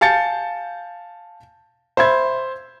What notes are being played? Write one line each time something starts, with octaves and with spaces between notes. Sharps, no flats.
F5 G#5 A5 G6 A6 C#7
C5 E5 B5 G#6